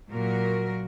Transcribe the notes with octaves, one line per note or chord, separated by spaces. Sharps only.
A#2 F#3 F#4 A#4